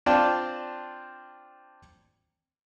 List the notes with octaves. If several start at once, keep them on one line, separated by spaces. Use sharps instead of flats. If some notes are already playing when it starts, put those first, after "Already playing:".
C4 D4 F4 D5 G5 A5